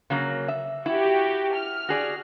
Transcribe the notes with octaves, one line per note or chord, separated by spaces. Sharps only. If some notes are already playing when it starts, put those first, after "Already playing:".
C#3 F#3 A#3
E5
E4 F#4 G4
F6
F#4 G#4 D5